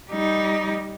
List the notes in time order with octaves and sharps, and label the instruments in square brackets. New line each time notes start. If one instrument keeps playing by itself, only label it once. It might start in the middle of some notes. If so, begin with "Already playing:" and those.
[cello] G3 D#4